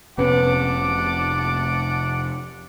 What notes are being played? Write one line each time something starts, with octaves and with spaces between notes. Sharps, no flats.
F1 C3 B3 C#4 F#5 A5 D6